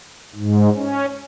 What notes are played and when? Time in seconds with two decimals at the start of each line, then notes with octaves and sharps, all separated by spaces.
0.35 G#2
0.75 C#4